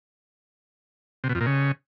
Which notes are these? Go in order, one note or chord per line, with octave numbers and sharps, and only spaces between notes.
C3
B2
F2
A#2
C#3